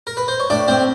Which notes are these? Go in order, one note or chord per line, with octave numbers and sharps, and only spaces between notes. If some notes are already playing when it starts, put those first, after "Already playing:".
A#4
B4
C5
C#5
A2 D4 D5
A2 C4 C5